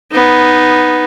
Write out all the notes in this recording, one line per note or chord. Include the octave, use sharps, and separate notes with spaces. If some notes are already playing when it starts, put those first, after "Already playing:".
B3 D#4